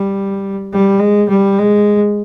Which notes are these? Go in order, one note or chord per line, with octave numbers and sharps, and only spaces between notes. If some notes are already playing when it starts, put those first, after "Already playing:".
Already playing: G3
G3
G#3
G3
G#3